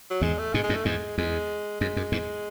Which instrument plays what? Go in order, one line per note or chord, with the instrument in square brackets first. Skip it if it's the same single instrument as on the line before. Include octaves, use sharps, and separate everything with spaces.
[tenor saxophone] F#3
[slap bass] E2 G#2 [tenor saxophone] G#3
[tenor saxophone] A3
[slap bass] G#2 B2 [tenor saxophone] G#3
[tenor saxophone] G#3
[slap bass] F#2 A2
[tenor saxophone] A3
[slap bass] E2 G#2 [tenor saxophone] G#3
[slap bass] E2 [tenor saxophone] G#3
[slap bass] F#2 [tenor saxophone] G#3
[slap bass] F#2
E2 G#2